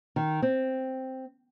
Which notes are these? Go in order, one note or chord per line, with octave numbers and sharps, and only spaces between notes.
D#3
C4